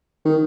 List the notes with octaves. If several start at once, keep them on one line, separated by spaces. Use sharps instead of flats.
D#3